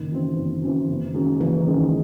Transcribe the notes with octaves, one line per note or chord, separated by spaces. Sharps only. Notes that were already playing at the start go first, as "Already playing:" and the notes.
Already playing: F#1 D#3
F#2 E3 C4
F#1
F#2 E3 C4
F#1
F#2 D#3 G#3 C#4
F#1 E3
F#2 D#3 G#3 C#4